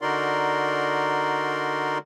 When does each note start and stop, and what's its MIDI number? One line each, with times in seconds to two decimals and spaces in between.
0.02 1.98 50
0.02 1.98 63
0.02 1.98 66
0.02 1.98 70
0.02 1.98 74
0.02 1.98 84